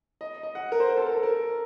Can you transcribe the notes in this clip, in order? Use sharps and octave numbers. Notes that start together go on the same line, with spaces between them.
D#5
D#5
F#5
A#4
C5
A#4
A4
A#4
A4
A#4